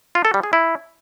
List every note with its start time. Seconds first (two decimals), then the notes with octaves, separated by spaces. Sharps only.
0.15 F4
0.25 A4
0.34 G3
0.43 G#4
0.53 E4